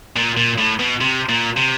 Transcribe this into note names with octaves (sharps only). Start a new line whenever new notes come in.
A#2
A#2
A2
B2
C3
A#2
C3